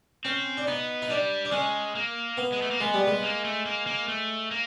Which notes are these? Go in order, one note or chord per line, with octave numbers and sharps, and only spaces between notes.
C4 C#4
D4
B3 D#4
D#4
G3 D4
D4
G#3 C#4
A#3
B3
G#3
A3
A#3
G#3 B3
G3
G#3
A#3
A3
A#3
A#3
A3
A#3